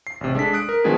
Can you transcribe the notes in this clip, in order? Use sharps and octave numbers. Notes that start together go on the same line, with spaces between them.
C7
A1 C3
G#3 D4 A4 B6
D#6 F#6 D7
A#4
D#3 F3 G#3 B3 D4 G#4